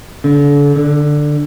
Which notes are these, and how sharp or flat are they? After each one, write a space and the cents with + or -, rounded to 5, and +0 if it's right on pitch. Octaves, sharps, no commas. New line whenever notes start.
D3 -35
D3 +10